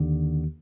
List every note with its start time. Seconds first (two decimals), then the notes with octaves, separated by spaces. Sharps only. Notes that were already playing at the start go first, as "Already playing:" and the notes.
Already playing: D#2 D3